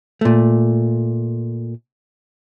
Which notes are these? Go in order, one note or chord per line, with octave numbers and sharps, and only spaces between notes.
A#2 A3